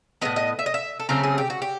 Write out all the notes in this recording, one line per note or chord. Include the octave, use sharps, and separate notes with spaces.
A2 F#3 B3 D#5
D#5
E5
D#5
E5
A4
C#3 F#3 A3 C4 A#4
G#4
G4
F#4
G4